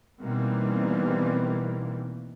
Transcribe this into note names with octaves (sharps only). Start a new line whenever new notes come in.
B2 D#3 E3 G3 A#3 C4